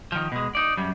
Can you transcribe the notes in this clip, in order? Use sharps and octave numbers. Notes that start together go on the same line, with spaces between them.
D#3 F3
B2 G#3
D#4 D5
F#2 G3